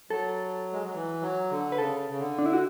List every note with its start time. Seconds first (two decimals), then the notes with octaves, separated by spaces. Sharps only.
0.10 F#3 A4
0.73 G#3
0.84 F#3
0.94 E3
1.22 F#3
1.50 D3
1.72 B4
1.78 C#3 A4
2.10 C#3
2.19 D3
2.38 D4
2.46 E4
2.53 F#4